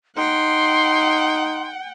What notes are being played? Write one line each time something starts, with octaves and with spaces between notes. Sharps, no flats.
D#4 F#5 G5 C6